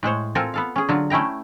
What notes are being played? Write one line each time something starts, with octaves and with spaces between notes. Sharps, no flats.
A2 G#3 C5 C#5
C4 F4 A4 A#4 G#5
B3 A4 F5
C#4 G#4
D3 F#3 F4
A3 C#4 E4 G5 A#5